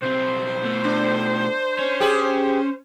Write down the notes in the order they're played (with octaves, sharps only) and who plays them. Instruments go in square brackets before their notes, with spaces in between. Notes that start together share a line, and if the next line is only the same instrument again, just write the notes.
[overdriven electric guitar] B1 C4 [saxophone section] C5
[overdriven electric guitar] B2 A3
[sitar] D4
[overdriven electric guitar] C#4
[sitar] G4 G#4